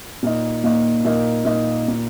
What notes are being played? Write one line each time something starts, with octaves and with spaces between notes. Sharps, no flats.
A#2 A#3 D#4
A#2 A#3 D#4
A#2 A#3 D#4
A#2 A#3 D#4
A#2 A#3